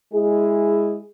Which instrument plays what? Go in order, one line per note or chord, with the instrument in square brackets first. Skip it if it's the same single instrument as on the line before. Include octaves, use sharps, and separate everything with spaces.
[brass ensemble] G#3 E4 G#4